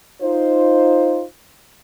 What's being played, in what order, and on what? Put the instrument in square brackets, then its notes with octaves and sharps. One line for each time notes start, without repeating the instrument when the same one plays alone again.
[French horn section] D#4 F4 C5